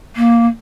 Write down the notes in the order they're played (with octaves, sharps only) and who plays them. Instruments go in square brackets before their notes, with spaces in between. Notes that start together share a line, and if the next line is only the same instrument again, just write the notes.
[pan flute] A#3